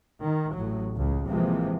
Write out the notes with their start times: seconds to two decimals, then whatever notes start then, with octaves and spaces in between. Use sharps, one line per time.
0.24 D#3
0.56 A1 A2 F#3
0.96 C#2 C#3 G#3
1.28 C3 E3 F3 G#3 A#3